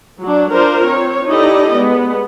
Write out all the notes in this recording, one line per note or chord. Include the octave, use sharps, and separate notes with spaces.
F#3 D4
D4 F4 A#4 C5
C4 C#5
D#4 E4 G4 A4 D5 D#5
G#3 B3